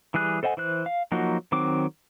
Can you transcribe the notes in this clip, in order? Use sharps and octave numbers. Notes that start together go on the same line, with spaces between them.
E3 G3 G#4 F#6
A4 C5 D#5 F#5 G#5
E3 C5 F#6
F5
F3 F#3 A#3 D#4 F#4
D#3 F#3 C4 D6